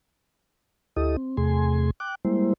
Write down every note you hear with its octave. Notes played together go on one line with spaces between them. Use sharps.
D2 E4 G4 A4 D#5 D#6
C4
E2 C3 A3 G#4 G#5 C6
G5 D6 F#6
G3 G#3 A#3 E4 C5